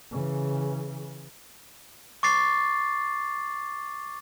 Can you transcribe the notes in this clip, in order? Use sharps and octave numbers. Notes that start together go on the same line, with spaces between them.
C#3 E3
C#6 D6 A6 C7